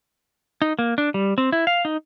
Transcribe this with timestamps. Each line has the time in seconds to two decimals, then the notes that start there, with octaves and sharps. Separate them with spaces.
0.62 D#4
0.79 A#3
0.98 D4
1.14 G3
1.38 C4
1.52 E4
1.67 F5
1.85 D#4